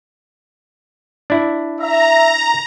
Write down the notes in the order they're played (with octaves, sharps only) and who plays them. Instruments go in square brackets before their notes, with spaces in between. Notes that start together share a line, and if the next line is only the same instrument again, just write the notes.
[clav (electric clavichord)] D4 E4
[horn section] E5 [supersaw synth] A#5